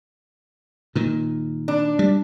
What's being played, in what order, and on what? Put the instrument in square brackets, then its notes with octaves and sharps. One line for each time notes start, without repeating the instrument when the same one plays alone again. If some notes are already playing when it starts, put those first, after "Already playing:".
[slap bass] A#2 D#3
[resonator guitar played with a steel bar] D4
[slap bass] G3